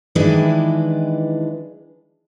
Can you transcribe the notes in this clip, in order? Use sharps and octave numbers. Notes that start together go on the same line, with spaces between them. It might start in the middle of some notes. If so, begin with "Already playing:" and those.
D#3 E3 G#3 D4 E4 B4